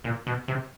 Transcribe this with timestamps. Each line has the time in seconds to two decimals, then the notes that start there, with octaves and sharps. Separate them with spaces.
0.04 A#2
0.27 B2
0.48 C3